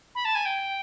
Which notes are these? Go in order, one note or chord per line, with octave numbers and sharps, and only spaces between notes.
B5
A5
G#5
G5